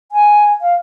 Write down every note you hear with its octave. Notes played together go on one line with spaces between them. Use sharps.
G#5
F5